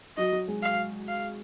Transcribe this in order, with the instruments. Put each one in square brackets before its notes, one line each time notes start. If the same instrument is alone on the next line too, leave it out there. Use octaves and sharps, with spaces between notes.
[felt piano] F#3 F#4 [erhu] D#5
[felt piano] F#3 F#4
G#3 G#4
[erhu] F5
F5